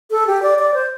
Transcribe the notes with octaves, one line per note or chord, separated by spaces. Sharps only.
A4
G4
D5
D5
C5